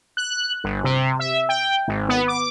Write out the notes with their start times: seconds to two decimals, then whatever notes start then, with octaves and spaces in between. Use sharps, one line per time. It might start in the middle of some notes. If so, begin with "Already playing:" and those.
0.17 F#6
0.64 G1
0.84 C3
1.19 E5
1.49 G5
1.88 G#1
2.09 B3
2.28 D6